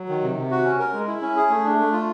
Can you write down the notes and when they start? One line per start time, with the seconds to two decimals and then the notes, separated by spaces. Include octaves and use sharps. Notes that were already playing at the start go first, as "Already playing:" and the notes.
Already playing: F#3
0.09 D#3
0.22 C3
0.36 C3
0.51 F#4
0.65 C#4
0.79 A#4
0.93 G#3
1.07 E4
1.21 C#4
1.36 G#4
1.50 A3
1.64 D4
1.78 A3
1.93 F4